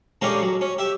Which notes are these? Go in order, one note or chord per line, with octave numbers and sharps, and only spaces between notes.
A#2 D3 G#3 A#3 C#4 G4
F#3
C#4
G4 E5